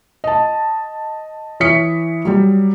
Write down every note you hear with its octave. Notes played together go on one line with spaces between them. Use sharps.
D#5 A5
E3 C#5 D#6 B6 C#7
F#3 G3